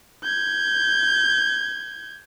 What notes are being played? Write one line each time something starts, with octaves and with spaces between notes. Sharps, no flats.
G6 G#6